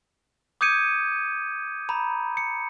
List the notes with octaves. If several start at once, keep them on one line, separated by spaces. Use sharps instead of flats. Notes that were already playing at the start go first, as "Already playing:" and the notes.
D6 D#6 G6 G#6 C#7 D#7
A#5 B5
C#7